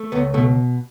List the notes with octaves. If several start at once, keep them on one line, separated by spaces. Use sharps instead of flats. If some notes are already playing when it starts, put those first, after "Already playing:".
Already playing: A3
C#2 B3
B2 A3